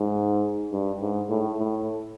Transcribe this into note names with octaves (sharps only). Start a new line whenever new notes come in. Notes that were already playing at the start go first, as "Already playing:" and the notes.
Already playing: G#2
G2
G#2
A2
A2